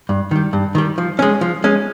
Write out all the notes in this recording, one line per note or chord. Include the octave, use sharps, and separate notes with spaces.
G2
D#3 G3
G2
D#3 G3
F3
G#3 C#4
F3
G#3 C#4